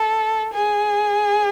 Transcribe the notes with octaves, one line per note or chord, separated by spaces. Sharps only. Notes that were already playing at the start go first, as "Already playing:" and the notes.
Already playing: A4
G#4